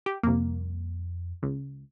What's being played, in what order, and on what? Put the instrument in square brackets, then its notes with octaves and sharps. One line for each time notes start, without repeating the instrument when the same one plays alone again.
[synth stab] G4
[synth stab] C2 A#3 [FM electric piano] F2
[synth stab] C#2